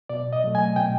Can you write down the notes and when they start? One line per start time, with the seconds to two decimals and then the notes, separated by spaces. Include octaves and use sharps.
0.09 B2 D5
0.33 D#5
0.44 F#3 A3
0.55 G#5
0.76 B2 G5